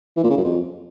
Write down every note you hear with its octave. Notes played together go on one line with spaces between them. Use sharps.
E3
A#2
C#3
F#2
F2